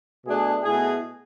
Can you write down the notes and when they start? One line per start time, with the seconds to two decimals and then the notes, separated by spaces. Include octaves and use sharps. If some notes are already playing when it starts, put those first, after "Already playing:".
0.24 B2 A3 D4 G#4
0.63 B2 A3 E4 G#4